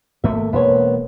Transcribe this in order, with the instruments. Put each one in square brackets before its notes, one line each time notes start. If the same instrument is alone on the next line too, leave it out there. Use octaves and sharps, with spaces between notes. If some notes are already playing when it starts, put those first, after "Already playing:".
[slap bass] G#1 A3 A#3 [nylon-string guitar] E5
[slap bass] E1 A#3 [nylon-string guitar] B3 C5 C#5